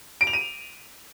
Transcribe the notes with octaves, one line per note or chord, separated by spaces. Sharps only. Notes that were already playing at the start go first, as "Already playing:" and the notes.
D7
F7
D#7